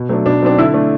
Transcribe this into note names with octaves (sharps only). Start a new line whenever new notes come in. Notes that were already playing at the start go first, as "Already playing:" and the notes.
Already playing: B2
F#3 A3 D4
B2 D4
F#3 C4 D4
D3 E4
A3 D4